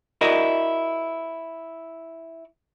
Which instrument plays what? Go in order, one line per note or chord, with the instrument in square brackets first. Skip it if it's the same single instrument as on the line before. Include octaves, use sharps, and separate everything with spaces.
[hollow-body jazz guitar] E4 F#4 A#4 D5 D#5